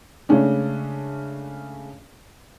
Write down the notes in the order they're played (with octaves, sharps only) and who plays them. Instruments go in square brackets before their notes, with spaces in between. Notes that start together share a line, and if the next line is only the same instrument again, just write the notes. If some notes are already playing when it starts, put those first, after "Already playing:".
[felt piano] C#3 G#3 A3 C#4 D4